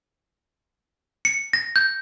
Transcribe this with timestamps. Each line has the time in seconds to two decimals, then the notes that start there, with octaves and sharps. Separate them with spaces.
1.25 C#7
1.53 A#6
1.76 G6